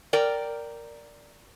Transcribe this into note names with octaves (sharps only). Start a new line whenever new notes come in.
A#4 D5 G5